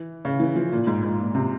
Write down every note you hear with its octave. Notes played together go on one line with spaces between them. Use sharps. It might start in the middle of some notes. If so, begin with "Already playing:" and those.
Already playing: E3
C#3
E3
F3
A#2
G#2
G#2
A#2
C3